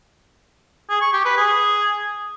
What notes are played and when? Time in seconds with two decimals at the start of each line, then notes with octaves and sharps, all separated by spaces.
0.90 G#4
1.01 C#6
1.13 G4
1.25 B4
1.37 G#4